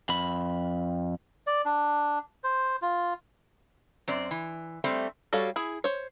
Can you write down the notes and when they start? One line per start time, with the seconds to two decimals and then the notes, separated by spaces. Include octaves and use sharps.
0.09 F2 B5
1.47 D5
1.65 D4
2.44 C5
2.82 F4
4.08 F#2 C4 D5
4.31 E3
4.84 G3 A3 C4 D5
5.33 G3 F#4 A4 C#5 F5
5.56 E4 G#4
5.84 C5 C#5